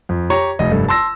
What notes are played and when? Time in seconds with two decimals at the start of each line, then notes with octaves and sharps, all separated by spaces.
0.09 F2
0.30 G4 C#5 A#5 C#6
0.59 F1 D#5
0.71 F1 G2 A4
0.88 A5 C6 E6 A#6